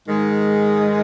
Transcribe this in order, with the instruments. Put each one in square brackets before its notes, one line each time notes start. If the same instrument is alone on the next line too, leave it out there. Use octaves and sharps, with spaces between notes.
[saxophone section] G#2 D#3 G#3